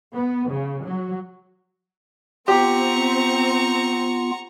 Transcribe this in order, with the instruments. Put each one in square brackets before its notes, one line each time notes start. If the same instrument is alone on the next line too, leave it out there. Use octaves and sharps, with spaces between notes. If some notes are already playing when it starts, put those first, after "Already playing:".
[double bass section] B3
C#3
F#3
[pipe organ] B3 F4 [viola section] C4 [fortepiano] G4 [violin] A#5 C#6